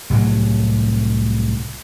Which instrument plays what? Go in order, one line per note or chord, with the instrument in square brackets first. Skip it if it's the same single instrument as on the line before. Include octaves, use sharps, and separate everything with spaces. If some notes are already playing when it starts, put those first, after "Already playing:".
[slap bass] C2 A2 F#3